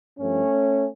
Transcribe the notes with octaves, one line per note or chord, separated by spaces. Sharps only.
G2 F3 A3 C#4